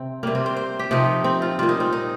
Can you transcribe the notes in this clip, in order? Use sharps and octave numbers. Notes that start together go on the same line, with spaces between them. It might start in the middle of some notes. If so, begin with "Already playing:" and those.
Already playing: C3 C4
C3 G3 A#3
C4
C5
C5
G4
C3 F3 D#4
C4
F4
A#2 G3 F4
D#4
C4
D#4